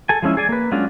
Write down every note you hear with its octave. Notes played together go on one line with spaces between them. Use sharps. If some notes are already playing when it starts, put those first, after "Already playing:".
G#4 A4 G#5
F3 G#3 C#4 E4
G#4 D5 G#5
A#3 B4
F#3 G#3 C#4 D4 F4